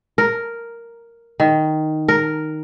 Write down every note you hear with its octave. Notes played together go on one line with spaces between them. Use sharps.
A#4
D#3
A#4